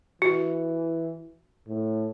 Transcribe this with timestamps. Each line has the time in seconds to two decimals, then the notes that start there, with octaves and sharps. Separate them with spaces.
0.22 E3 F#4
1.68 A2